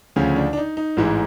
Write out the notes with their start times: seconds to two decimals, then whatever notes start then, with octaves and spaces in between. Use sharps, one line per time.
0.16 D2 C#3 F3 C#4
0.36 D4
0.53 D4
0.57 D#4
0.77 D#4
0.97 A1 G#2 E3 E4